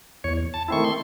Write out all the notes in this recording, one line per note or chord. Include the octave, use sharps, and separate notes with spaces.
E2 C#5
A5
D#3 A3 C4 E4 C#6
C6